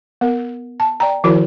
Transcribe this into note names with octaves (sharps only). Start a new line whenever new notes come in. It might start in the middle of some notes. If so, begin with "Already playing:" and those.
B3 A#4
A5
D5 G5 A#5
D#3 F3 E4 F#4 A#4 C5